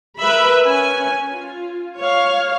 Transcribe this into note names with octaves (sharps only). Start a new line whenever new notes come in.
A#4 B4 E5 B5
C#4 G#5
F4
C#5 F5